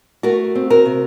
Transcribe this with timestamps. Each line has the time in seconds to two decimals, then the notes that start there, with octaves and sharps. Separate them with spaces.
0.23 A3 F#4 A#4
0.55 C4
0.70 F#4 A#4
0.86 C3